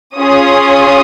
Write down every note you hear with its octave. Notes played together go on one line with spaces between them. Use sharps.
C#4 F4 G#4 D#6